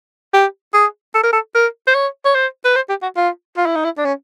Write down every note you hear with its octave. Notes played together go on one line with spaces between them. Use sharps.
G4
G#4
A4
A#4
A4
A#4
C5
C#5
C#5
C5
B4
C5
G4
F#4
F4
F4
E4
D#4
E4
D4
C#4